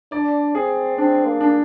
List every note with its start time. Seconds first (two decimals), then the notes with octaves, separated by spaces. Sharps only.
0.12 D4 D5
0.55 C4 G#4
0.98 C4 D4
1.26 A#3
1.40 D4